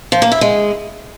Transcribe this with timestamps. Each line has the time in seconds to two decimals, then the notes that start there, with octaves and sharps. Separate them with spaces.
0.12 F3
0.22 A#3
0.32 E4
0.41 G#3